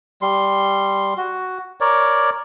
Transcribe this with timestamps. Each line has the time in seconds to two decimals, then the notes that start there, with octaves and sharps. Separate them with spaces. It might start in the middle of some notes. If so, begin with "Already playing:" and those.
0.22 G3 C6
1.18 F#4
1.81 A#4 C#5 D5